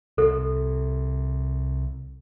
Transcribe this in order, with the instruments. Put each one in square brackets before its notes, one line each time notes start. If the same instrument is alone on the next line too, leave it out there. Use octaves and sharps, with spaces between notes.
[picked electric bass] C2 C3 [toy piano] A4